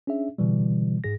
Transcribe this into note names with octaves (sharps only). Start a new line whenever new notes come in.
C#4 D4 G#4 E5
B2 D3 E3 G3
G#2 G#4 A#6